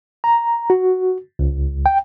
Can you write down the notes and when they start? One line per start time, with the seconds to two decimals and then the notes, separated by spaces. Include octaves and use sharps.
0.24 A#5
0.70 F#4
1.39 C#2
1.86 G5